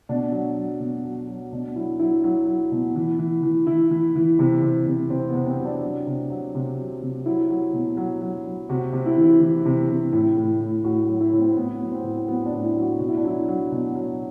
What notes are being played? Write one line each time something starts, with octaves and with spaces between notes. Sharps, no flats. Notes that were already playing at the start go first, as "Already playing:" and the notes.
B2 D4
F#3
F#3
B2
F#3
F#3
B2 D4
F#3 E4
F#3 E4
F#3 E4
F#3
B2
E3
E3
E3
E3 E4
E3
E3
C3
C3
C3
C3 C4
B3
C3
C4
F#3
D4
F#3
C3
F#3
C3
F#3
C3
F#3 E4
F#3
B2
F#3
F#3
F#3
C3 F#4
C3
E4
E3
E4
E3
C3
C3
A2
A2
A2
A2 F#4
F#4
F#3
E4
A2
C4
A2 B3
B3
F#3
C4
A2
F#3 B3
D4
A2
E4
F#3
F#4
B2 F#4
E4
D4
F#3 E4
F#3
B2
F#3